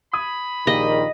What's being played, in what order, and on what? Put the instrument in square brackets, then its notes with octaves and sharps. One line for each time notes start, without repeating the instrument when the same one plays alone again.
[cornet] B5 [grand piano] D#6 G#6 D#7
[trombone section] A#1 A#2 D#3 [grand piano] G4 G#4 F5 [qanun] D#5